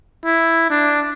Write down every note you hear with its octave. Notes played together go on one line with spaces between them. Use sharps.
E4
D4